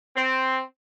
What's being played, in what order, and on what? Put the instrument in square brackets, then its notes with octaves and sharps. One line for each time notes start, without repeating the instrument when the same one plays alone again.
[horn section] C4